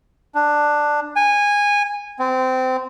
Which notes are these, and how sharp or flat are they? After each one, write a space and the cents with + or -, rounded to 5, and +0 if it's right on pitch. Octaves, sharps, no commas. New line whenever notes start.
D4 +10
G#5 -15
C4 -20